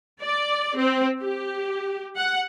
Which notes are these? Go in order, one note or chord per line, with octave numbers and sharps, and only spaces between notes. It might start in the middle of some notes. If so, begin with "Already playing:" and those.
D5
C4
G4
F#5